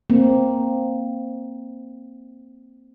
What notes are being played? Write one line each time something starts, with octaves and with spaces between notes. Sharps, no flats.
A#3 C4